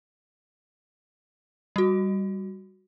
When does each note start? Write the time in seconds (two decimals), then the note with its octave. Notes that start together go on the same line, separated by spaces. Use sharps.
1.76 G3 F#4